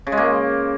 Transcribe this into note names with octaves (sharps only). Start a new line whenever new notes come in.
C#3
G#3
A#3